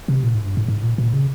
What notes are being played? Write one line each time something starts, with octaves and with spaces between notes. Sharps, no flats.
C3
A#2
G#2
G2
G#2
G#2
A#2
A#2
C#3